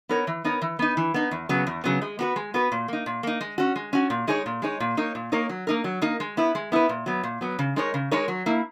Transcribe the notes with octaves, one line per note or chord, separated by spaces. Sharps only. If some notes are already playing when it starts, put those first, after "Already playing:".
B3 D#4 A#4 C#5
E3
B3 D#4 A#4 C#5
E3
B3 D#4
E3
B3 D#4
E2
C#3 F#3 B3
E2
C#3 F#3 B3
G#3
B3 F#4 B4
G#3
B3 F#4 B4
A#2
A#3 D#4
A#2
A#3 D#4
G#3
C#4 F#4
G#3
C#4 F#4
A#2
G#3 D#4 G#4 C#5
A#2
G#3 D#4 G#4 C#5
A#2
A#3 D#4 A#4 C#5
A#2
A#3 D#4 A#4 C#5
F#3
A#3 D#4 A#4
F#3
A#3 D#4 A#4
G#3
B3 E4 B4
G#3
B3 E4 B4
A#2
F#3 B3
A#2
F#3 B3
C#3
G#3 D#4 A#4 C#5
C#3
G#3 D#4 A#4 C#5
F#3
A#3 E4